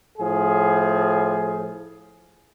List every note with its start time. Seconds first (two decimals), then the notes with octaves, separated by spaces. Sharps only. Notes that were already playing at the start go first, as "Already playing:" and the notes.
0.19 A2 F3 G#4